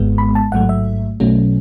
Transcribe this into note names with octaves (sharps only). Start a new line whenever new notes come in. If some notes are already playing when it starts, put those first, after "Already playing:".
Already playing: G#1 G#2 G#3 B3
B5
A5
A1 G#2 F#3 A3 F#5
E5
B1 B2 F#3 A3 C#4